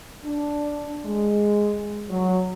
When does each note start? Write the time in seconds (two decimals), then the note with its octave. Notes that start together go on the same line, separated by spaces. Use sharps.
0.24 D4
1.05 G#3
2.10 F#3